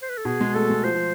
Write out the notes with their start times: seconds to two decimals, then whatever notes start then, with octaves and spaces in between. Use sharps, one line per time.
0.02 C5
0.09 B4
0.18 A4
0.25 B2 G#4
0.41 G#3
0.55 A3 A4
0.70 G#3
0.84 F3 C5
0.95 F3